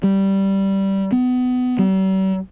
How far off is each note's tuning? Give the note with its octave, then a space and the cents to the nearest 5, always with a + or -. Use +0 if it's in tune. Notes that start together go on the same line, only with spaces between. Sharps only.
G3 -10
B3 +25
G3 -45